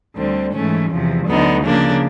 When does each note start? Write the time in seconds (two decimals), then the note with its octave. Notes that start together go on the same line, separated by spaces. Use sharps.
0.16 D2 D3 G3 C4
0.53 G#2 E3 A3 C#4
0.90 E2 C3 F3
1.26 D2 D3 F#3 B3 D#4
1.64 C#3 F3 A#3 D4